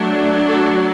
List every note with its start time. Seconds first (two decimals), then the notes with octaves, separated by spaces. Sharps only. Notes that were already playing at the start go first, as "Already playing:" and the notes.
Already playing: F#3 A3 D4
0.46 A3 A4